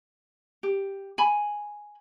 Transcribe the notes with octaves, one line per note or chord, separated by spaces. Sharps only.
G4
G#5 B5